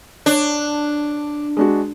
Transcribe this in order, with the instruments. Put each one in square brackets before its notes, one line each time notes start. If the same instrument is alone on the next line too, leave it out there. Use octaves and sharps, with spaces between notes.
[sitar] D4 [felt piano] C#5
[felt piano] G#3 D4 F#4